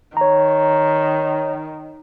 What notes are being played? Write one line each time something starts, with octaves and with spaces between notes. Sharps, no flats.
D#3 C#5 A#5